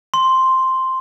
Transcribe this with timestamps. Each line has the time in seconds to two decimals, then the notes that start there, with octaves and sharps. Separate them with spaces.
0.14 C6